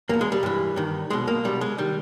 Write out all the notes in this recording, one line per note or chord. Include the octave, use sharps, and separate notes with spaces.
E2 B2 A#3
G#3
G3
G2 E3
G2 D#3
B1 B2 G#3
A#3
B1 B2 G3
G#3
D#3 G3